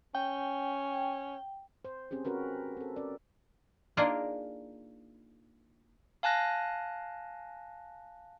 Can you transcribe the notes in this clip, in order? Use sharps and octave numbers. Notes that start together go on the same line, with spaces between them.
C#4 G5
C5
C4 C#4 G4 G#4
C4 C#4 F#4 A#4 B4
C4 A4
C#4 A#4 D5
A#3 D4 D#4 F4 G#4 A#4
F5 G#5 A5 F#6 A#6